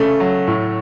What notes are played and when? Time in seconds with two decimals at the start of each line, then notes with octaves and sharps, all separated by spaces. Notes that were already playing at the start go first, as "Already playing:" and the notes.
Already playing: C#3 A3
0.20 F#3
0.47 A2